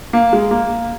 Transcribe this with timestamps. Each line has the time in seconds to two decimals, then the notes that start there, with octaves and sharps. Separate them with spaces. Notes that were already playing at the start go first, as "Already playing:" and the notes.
0.13 A#3
0.33 G#3
0.51 A#3